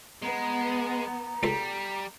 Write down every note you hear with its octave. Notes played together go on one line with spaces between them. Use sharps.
G#3 B3 A#5
C#2 G3 A4 C6